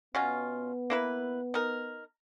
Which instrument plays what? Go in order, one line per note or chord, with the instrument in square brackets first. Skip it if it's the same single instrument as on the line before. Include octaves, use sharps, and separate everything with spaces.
[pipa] B2 C#4 F4 [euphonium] B3
[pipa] A#3 E4 B4
D#4 A#4